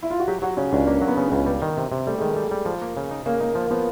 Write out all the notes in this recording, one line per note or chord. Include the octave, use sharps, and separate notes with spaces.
E4
F4
F#4
F#3 G4
F#3 F#4
C#3 C#4
C#2 D4
A#3 C#4
F#3
B3
C#3
B3
C#2
G3
D#3
C3
C3
G3 A3
D#3 G#3
A3
G3
G3
F3
A#3
C#3
D#4
C#3 A#3
A#3 D#4
F3 A#3
F3 B3